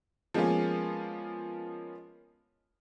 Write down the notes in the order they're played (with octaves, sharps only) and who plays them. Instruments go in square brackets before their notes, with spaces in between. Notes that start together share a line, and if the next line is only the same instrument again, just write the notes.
[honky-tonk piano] F3 G#3 A#3 B3 C#4 F4